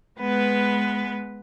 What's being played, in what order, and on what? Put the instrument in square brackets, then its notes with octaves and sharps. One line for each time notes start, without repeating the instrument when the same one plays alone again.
[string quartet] G#3 B3 B4